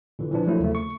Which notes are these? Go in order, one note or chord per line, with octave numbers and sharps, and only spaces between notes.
A#2 D3 E3
E3 F3 D4
F3 F#3 A3 A#3 E4
D#2 C#3 A3
C#6